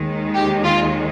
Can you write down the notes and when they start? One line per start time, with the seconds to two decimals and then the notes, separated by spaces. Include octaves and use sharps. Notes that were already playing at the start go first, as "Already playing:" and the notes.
Already playing: D#2 D#3 G#3
0.34 G4
0.64 F4